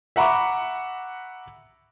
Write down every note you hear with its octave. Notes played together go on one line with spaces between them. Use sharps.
E5 F#5 A#5 B5 C#6 D6